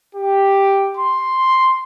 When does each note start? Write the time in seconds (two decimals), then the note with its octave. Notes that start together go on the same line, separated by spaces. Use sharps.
0.16 G4
0.98 C6